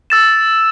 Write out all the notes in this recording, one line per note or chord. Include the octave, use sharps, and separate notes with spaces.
E6 A6 E7